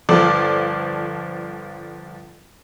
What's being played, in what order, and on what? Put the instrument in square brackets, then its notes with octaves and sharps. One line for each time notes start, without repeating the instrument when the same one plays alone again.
[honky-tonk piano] G1 F3 A4 D5